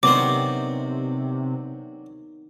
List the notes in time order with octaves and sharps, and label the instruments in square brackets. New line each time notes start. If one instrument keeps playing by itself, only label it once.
[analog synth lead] C3 [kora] D#3 B3 C4 [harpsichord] F#3 D4 C5 [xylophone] D6